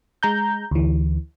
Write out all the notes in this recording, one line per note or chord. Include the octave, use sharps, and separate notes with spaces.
G#3 A#5 G6
D2 E3